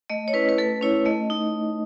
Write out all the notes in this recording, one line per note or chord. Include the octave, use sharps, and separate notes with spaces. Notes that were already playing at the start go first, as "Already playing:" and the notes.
A3 D#5
C#5
C#4 E4 B4
B4
A3 A4
C#4 E4 C#5
A3 D#5
D#4